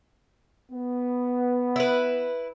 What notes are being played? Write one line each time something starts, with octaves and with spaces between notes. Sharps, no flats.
B3
E4 B4